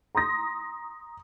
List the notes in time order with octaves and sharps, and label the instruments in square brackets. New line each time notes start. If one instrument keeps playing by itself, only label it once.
[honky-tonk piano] A#5 C6 D#6 A#6